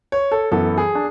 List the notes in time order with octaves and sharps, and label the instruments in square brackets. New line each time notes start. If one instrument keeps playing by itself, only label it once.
[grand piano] C#5
A4
F#2 E3 B3 A4
G#4
D4